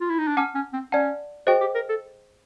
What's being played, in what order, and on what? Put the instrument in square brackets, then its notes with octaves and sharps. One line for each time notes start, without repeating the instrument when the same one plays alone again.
[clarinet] F4
E4
D#4
D4
[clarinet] C#4 [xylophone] F#5 A5 D6 F6
[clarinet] C#4
C4
[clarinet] C#4 [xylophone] D5 F#5 A5
[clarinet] F#4 [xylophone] G#4 C5 D#5 G5
[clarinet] G4
A#4
A4